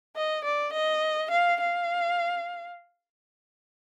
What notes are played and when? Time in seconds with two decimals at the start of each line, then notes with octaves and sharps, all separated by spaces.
0.16 D#5
0.45 D5
0.73 D#5
1.31 F5
1.61 F5